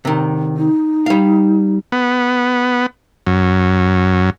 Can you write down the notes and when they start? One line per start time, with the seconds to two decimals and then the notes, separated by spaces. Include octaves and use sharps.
0.05 C3 D#3
0.57 D#4
1.06 G3 F5
1.92 B3
3.27 F#2